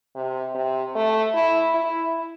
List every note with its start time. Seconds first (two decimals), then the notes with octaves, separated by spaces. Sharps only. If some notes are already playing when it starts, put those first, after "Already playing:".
0.15 C3
0.55 C3
0.95 A3
1.34 E4
1.74 E4